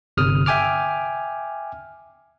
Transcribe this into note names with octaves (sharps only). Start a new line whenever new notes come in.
G1 C3 D#6 F6
E5 G5 G#5 D6 F6